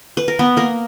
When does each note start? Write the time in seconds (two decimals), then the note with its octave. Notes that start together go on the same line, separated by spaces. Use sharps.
0.17 B4
0.28 A#4
0.39 B3 B4
0.57 A#3 A#4